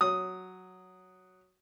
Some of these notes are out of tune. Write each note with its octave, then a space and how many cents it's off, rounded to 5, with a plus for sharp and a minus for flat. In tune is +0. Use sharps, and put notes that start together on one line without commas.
F#3 +0 D#6 +0